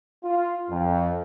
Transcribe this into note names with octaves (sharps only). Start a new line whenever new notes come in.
F4
F2